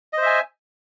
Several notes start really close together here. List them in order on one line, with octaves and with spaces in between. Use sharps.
D#5 C5 E5 G#5